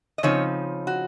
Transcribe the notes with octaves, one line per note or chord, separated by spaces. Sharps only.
D#5
C#3 F3 C4 D#4 C#5
F#4